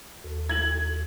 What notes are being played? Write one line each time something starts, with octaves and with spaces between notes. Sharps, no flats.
D#2 F#4 A4
G#6 F#7